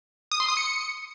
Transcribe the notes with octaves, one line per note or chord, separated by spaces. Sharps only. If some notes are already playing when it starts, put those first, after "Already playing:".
D#6
C6
D#6
C#7